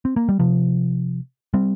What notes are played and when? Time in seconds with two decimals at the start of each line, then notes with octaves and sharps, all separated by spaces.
0.05 C4
0.16 A#3
0.29 G3
0.39 C3 F3
1.54 G3 C4